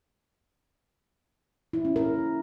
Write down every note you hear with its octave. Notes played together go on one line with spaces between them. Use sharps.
E4
C#4
A#4